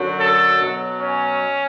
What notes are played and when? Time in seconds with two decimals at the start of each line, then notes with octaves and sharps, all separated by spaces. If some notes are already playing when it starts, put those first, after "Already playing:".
Already playing: F#2 D3 F#3
0.20 A4
0.61 B2 F#3
1.00 C#4